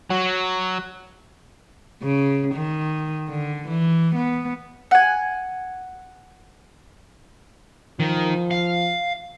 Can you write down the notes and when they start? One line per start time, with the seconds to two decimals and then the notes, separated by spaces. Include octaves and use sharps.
0.10 F#3
2.02 C#3
2.54 D#3
3.29 D3
3.68 E3
4.15 B3
4.91 F#5 G#5
8.00 D#3 F3
8.51 F5